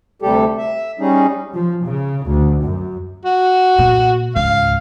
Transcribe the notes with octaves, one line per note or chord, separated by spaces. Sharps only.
D2 C3 G3 G4 A4
E5
G3 C#4 D#4 G#4
F3
C#3
D2
F#2
F#4
A#2
C#2 G#2 F5